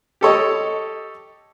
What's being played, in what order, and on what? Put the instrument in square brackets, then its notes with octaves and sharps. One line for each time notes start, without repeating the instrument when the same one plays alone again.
[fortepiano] G4 A4 C#5 D#5